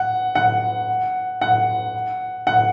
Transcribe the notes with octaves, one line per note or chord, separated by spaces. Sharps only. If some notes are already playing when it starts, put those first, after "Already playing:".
Already playing: F#5
F#5
F#5
F#5